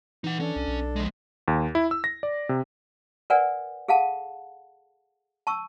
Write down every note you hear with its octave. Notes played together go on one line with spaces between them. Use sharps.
E3 D#4 F#5
C#4 D4 A4
C2
B1
F3 G#3
D#2
E4
E6
A#6
D5
C3
A#4 B4 D5 F#5 G#5
G#4 A4 F5 F#5 A5
A5 C#6 E6